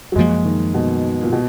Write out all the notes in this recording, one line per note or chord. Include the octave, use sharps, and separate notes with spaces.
F#3
F#2 F3 G#3 A#3
D#3
B2
A#2
B2